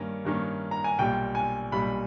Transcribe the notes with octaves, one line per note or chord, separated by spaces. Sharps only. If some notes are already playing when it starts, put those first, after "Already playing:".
Already playing: G2 D#3 A#3 C#4
G2 D#3 A#3 C#4
A#5
G#5
B1 A#2 G3 G5
G#5
B1 A#2 G3 B5